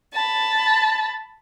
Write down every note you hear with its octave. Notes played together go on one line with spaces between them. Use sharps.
A5 B5